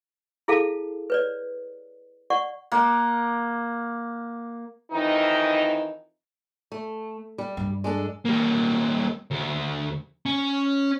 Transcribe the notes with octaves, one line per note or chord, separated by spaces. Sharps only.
E4 G#4 A4 F5 A5
B4 C#5 D5
D5 F#5 C#6
A#3 F#5
F2 D#3 E3 D#4
A3
G3
G2
G#3 D4 A4
G3 A#3
D2
C#4